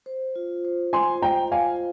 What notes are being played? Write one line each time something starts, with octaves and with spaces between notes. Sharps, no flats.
C5
F4
C5
C5 G#5 C6
D#5 G5 A#5
F4 F5 G#5